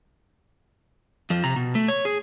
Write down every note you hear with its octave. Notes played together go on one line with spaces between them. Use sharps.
F2 F3
C3 A#5
B2
A3
C#5
G#4